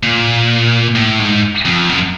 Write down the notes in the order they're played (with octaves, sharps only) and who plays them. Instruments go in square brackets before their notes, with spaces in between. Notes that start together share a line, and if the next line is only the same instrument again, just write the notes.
[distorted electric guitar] A#2
A2
G#2
F2
F#2